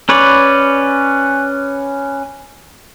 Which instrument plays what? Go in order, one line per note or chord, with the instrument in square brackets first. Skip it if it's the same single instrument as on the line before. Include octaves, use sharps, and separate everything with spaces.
[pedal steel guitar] C#4 B4 C#5 D5